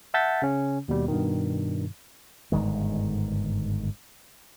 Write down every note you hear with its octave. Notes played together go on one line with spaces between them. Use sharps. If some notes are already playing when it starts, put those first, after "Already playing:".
E5 F#5 A5 G6 A6 B6
C#3 C#4
D#2 B2 G3
G2 B2 D#3
G1 G#2 D#3 G#3